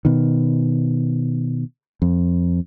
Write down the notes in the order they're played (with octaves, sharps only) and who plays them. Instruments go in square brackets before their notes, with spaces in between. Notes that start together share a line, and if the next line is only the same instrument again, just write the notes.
[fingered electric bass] B2 D#3
F2